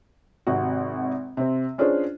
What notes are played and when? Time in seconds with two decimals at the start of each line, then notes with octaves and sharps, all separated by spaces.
0.47 G#1 C3 F#4
1.37 C3 C4
1.78 C#4 D4 F4 G#4 C5 C#5